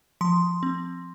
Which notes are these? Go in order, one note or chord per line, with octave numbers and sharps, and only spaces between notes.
F3 C6
C4